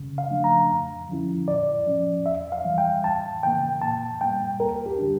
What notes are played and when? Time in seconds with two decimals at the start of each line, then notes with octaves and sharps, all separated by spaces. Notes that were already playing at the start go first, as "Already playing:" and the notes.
Already playing: C#3
0.18 F5
0.30 F3 A3 D4
0.44 A#5
0.70 F2
1.09 D3 F3 C#4 E4
1.48 A#2 D5
1.87 F3 C#4
2.26 E2 E5
2.52 F5
2.64 E3 G3
2.78 G5
3.04 C#2 A5
3.43 C#3 E3 A#3 G5
3.81 A#2 A5
4.21 G3 A#3 G5
4.60 D2 A#4
4.86 G4
4.98 D3 G3 D4